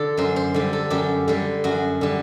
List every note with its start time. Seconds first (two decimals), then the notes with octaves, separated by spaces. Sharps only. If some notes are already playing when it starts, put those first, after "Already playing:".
Already playing: D3 A4
0.17 F#2 C5
0.36 C5
0.54 D3 G3
0.73 A4
0.90 F#2 G4
1.28 D3 G3
1.64 F#2 F#4
2.01 D3 G3